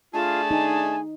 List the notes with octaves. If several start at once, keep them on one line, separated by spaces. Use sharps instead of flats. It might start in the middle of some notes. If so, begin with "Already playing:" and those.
A3 D4 F4 G#4 A5
D#4 G#5